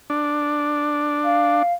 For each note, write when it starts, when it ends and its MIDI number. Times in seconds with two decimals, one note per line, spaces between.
0.10 1.63 62
1.23 1.72 77